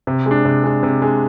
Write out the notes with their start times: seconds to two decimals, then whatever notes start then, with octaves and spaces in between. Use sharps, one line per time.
0.07 C3
0.26 G#3 D4
0.45 C3
0.64 G#3 D4
0.83 C3
1.02 G#3 D4